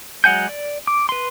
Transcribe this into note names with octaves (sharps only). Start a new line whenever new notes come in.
F#3 G#3 F#5 G#5 G6
D5
D6
B4 C6